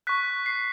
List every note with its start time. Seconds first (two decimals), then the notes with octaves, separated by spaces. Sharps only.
0.07 C#6 F#6 B6
0.46 C7